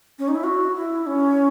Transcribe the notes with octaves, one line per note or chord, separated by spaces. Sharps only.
C#4
D#4
E4
F#4
E4
C#4